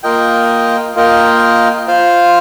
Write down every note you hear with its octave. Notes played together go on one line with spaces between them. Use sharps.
A#3 F4 A#4 D#5 G5
A#3 F4 A#4 D#5 G5
F4 C5 F5